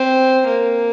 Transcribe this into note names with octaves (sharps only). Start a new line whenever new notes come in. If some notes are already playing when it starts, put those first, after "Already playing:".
Already playing: C4
A#3